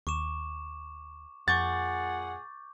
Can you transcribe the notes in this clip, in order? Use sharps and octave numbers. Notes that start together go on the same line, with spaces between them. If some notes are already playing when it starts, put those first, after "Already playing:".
D#2 C#6 D6 E7
F2 A#2 G#4 F#5 C#6 D6 G6 A6